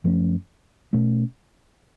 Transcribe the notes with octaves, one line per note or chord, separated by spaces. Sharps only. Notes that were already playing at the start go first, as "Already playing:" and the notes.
F#2 F3 A3 C#4
B2 A3 C#4